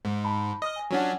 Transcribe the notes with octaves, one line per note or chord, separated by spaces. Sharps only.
G#2
A5 B5
D#5 D#6 F6
G#5
F#3 C#4 D4 F4 F#5